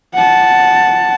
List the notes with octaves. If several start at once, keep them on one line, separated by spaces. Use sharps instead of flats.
F#5 A5